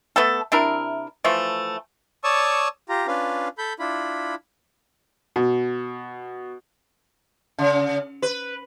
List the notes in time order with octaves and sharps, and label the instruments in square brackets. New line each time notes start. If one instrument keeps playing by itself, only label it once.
[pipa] A3 B3 A4
C3 D4 E4 A#4
E3 F3 A3
[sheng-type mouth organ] C#5 D5 A5 C#6 D#6 E6
F4 G4 A#5
C#4 D4 F4 B4 F5
A4 B5 G6
D4 E4 F4 B5
[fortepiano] B2
[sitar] C#3
B4